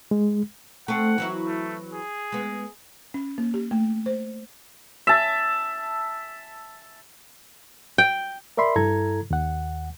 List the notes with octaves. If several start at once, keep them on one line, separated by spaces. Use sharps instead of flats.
G#3
A3 C4 F#5
E3 F#3 E4
A3
G#4
G#3 B3
C#4
A#3
G4
A3
C5
E5 A5
G5
A#4 D5 E5 B5 C6
G2 E4 A4 A#5 G#6
D#2 F#5